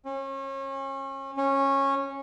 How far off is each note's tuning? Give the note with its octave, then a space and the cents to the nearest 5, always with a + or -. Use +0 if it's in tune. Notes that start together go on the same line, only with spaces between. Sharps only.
C#4 -35
C#4 -15